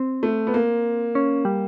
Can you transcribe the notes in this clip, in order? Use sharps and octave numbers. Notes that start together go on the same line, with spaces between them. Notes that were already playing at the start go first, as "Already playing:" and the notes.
Already playing: C4
A3
B3
A#3
C#4
G3